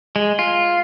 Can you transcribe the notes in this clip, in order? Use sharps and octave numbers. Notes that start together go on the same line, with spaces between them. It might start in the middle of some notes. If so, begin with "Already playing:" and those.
G#3
F4